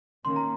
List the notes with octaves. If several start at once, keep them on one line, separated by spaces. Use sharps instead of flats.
D#3 A#3 C#4 C6
A#5